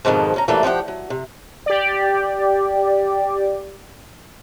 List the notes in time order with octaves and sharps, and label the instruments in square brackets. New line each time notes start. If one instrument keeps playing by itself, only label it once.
[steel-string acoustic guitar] F2 G#2 B2 D#3 F3
D2 C#4 A#5
E3 F#3 G3 A3 A#3
F3 G4 B4 F#5 G5
F#3
C3
[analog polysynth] G4 D5